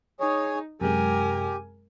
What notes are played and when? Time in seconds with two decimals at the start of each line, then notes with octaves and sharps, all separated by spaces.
0.20 D#4 G#4 C#5
0.81 F#2 C3 G#3 G4 A#4 G#5